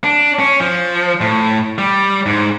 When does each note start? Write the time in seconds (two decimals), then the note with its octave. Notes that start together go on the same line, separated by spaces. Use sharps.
0.04 D4
0.39 C#4
0.60 F3
1.21 A2
1.78 G3
2.26 G#2